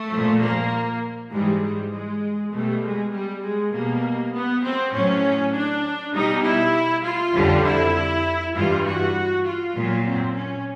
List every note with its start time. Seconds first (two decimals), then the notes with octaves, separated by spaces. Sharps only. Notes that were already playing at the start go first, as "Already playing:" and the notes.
Already playing: A3
0.11 A#2 F3
0.41 A#3
1.31 G#2 E3 G3 G#3
1.62 G3
1.92 G#3
2.52 B2 G3 A3
2.83 G#3
3.12 G3
3.43 G#3
3.72 B2 G3 A#3
4.34 B3
4.63 C4
4.93 A2 F#3 C#4
5.53 D4
6.13 B2 G3 D#4
6.44 E4
7.04 F4
7.34 F2 D3 G3
7.65 E4
8.55 G2 E3 G3 F4
8.85 F#4
9.45 F4
9.75 A#2 F#3
10.06 C4
10.35 C#4